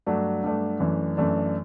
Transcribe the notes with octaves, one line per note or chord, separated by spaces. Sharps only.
G2 F#3 A3 D4
G2 F#3 A3 D4
F#2 E3 A3 D4
F#2 E3 A3 D4